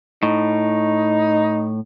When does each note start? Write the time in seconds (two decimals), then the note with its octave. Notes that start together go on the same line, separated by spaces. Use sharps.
0.23 A2 D#4